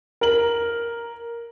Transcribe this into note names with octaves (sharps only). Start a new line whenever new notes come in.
A#4 F#7